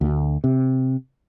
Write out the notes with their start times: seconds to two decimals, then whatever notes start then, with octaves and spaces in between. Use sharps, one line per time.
0.01 D2
0.44 C3